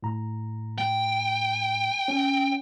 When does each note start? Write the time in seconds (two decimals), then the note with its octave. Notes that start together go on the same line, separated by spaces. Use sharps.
0.03 A2 A#5
0.78 G5
2.08 C#4